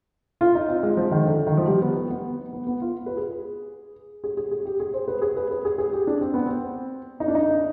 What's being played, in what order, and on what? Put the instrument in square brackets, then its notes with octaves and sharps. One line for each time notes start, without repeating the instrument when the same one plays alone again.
[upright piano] F4
D#4
C4
G#3
F3
D#3
D3
D3
D#3
F3
G3
B3
B3
B3
B3
B3
F4
B4
G#4
G#4
G#4
G#4
G4
G#4
C5
B4
G#4
B4
B4
G#4
G#4
G4
D4
C4
B3
C4
D#4
D4
D#4